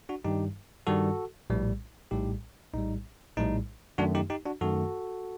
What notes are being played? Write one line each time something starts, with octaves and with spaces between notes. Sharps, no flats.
D4 F#4
G2 D#3 G3 D#4 G4
G2 D#3 G3 F#4 A4
A#1 A2 G3
A#1 A2 G3 D#4 G4
A#1 A2 G3 D#4
A#1 A2 G3 D#4
F#2 D#3 A3 D4 F#4
D#4 G4
D#4 G4
D4 F#4
F#2 D#3 A3 F#4 A4